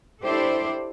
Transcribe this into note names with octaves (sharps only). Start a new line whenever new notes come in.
D4 E4 G4 A4 C5 D5